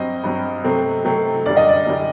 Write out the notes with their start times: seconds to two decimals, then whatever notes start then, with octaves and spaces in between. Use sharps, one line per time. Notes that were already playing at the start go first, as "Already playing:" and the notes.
Already playing: G2 F#3 C4 D#5
0.24 G2 F#3 C4
0.64 C3 F#3 A3 C4
1.05 C3 F#3 A3 C4
1.46 F#2 D3 G3 D5
1.57 D#5
1.68 D5
1.87 F#2 D3 G3